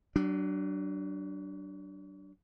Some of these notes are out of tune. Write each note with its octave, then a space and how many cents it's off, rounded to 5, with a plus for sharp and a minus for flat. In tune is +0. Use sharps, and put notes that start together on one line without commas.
F#3 +35 D4 +0